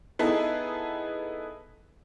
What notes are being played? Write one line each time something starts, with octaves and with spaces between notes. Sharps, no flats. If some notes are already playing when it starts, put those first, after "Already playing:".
B3 D#4 E4 G#4 A4